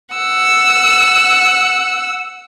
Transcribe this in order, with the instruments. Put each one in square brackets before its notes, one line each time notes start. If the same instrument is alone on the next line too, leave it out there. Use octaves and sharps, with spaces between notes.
[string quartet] F#5 E6